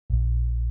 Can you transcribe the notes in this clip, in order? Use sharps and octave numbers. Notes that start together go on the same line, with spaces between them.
A#1